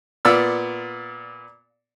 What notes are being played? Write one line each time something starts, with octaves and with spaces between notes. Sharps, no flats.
A#2 B3 D5 E6